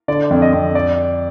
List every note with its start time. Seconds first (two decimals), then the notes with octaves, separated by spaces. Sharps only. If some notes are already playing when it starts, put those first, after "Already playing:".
0.08 D3 D5
0.31 F2
0.42 D#5
0.53 F2
0.75 D5